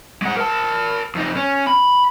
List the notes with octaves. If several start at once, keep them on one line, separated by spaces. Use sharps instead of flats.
G#3 F#5
A#4 A5
F2 D#4
C#4
B5